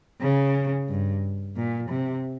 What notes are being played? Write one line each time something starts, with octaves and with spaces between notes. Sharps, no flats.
C#3
G2
A#2
C3